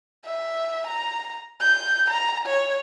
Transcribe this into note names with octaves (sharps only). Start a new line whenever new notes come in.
E5
A#5
G6
A#5
C#5